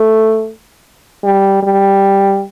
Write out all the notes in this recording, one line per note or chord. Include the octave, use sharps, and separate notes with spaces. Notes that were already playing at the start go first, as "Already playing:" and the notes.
Already playing: A3
G3
G3